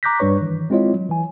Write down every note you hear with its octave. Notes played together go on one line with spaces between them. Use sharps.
A#5 D6 F#6 G6 A#6 B6
G2 G3 D4 B4 C#5 C#6
D#3 E3
G#3 C4 E4 F4 C#5 D#5
F#3
E3 G#5